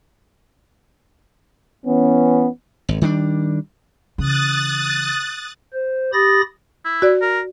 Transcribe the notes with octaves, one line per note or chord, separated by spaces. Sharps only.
E3 B3 C#4
G#1
D#3 G3 G#3 D4
C#3 E3 D#6 F#6 A6
C5
G4 B5 D#6 A6 A#6
E4
F#4 D5
A#4